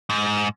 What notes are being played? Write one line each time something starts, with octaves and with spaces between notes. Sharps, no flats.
G#2